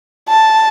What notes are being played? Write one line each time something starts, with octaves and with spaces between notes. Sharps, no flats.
A5